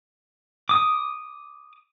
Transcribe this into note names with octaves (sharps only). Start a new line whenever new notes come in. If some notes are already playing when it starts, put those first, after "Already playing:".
D6 D#6